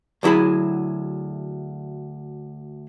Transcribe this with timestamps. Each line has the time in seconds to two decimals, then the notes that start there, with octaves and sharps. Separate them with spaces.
0.23 D2 F#3 E4 G#4 B5